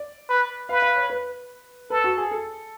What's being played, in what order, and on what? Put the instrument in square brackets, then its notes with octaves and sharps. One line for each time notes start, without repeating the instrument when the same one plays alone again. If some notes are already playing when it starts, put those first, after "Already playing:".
Already playing: [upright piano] D5
[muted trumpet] B4
[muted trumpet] B4 [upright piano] F5
[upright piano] F5
C#5
B4
[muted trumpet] A4 [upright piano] B4
[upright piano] F#4
G#4
A4